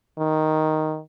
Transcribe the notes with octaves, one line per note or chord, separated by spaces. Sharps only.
D#3